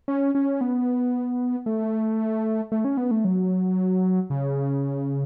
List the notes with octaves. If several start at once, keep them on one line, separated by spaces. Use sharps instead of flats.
C#4
C#4
B3
A3
A3
C#4
B3
A3
F#3
C#3